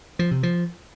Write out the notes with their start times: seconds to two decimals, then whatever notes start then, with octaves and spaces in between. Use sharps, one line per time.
0.19 F3
0.31 C3
0.43 F3